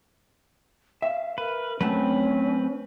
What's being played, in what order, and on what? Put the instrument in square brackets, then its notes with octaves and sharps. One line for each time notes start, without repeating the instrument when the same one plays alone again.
[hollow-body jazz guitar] E5 [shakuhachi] F5
[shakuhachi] A#4 [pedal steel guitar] B4
[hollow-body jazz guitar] F#3 A3 A5 [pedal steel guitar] C4 B4 [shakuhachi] C#4